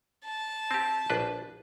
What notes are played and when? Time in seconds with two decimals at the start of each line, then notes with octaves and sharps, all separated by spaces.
0.25 A5
0.71 C4 G4
1.10 A#1 D4 B4